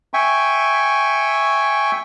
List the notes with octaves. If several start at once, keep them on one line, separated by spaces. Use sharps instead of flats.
E5 G5 G#5 C#6